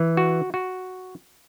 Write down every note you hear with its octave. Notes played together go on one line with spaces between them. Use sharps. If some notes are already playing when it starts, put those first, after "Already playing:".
Already playing: E3
F#4
F#4